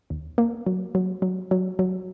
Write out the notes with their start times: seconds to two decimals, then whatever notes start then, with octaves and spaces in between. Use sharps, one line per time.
0.10 D#2
0.38 A#3
0.66 F#3
0.95 F#3
1.22 F#3
1.51 F#3
1.79 F#3